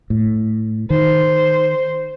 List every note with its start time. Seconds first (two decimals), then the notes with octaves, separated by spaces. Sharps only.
0.10 A2
0.90 D#3 C5